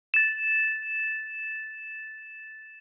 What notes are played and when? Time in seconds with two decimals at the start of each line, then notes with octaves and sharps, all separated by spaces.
0.14 A6 E7